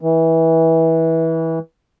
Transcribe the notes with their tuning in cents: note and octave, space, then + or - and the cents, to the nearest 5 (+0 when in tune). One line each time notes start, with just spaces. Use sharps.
E3 -20